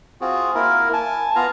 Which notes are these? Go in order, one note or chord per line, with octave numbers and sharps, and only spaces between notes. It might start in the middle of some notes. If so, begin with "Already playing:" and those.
C4 F4 F#4 G#4
A#3 E4 A#4
G#5 A5
B3 F4 F5 A#5